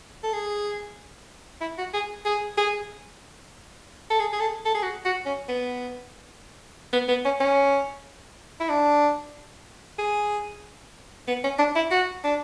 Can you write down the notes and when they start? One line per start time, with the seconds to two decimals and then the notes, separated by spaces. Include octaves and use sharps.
0.23 A4
0.33 G#4
1.61 E4
1.78 F#4
1.94 G#4
2.25 G#4
2.57 G#4
4.10 A4
4.19 G#4
4.33 G#4
4.40 A4
4.65 A4
4.75 G#4
4.83 F#4
5.05 F#4
5.26 C#4
5.48 B3
6.93 B3
7.09 B3
7.25 C#4
7.40 C#4
8.60 E4
8.69 D4
9.99 G#4
11.28 B3
11.44 C#4
11.59 D4
11.76 E4
11.91 F#4
12.24 D4